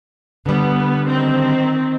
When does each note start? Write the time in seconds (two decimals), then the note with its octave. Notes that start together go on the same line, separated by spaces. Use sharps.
0.46 D3 G3 B3
1.05 D#3 C4